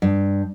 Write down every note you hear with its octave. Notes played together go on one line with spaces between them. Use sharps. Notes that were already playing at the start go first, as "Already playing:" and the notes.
G2